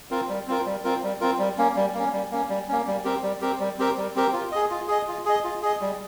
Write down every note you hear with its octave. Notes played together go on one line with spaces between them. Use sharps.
C4 F4 A#4
G3
C4 F4 A#4
G3
C4 F4 A#4
G3
C4 F4 A#4
G3
A#3 C#4
G3
A#3 C#4
G3
A#3 C#4
G3
A#3 C#4
G3
C4 G4 A#4
G3
C4 G4 A#4
G3
C4 G4 A#4
G3
C4 G4 A#4
F4
G#4 D#5
F4
G#4 D#5
F4
G#4 D#5
F4
G#4 D#5
G3